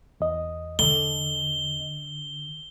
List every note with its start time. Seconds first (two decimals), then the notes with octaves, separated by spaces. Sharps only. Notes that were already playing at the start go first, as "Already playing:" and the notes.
0.20 E2 D#5
0.79 D3 G7